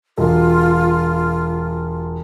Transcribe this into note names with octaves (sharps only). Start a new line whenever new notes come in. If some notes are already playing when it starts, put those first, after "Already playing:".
E1 F4